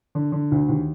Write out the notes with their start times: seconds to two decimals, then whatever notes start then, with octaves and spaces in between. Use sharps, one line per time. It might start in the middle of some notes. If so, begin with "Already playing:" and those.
0.15 D3
0.32 D3
0.51 D2
0.69 D#2